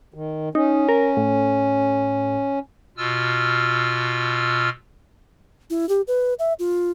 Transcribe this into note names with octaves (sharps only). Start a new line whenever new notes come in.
D#3
C#4 D#4
A#4
A2
B2 F4 E6 F6
E4
G4
B4
E5
F4